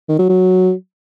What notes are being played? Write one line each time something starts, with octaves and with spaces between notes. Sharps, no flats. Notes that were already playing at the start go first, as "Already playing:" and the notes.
D#3
F#3
F#3